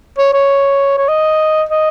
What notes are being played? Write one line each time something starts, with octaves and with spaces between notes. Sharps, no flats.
C#5
C#5
C#5
D#5
D#5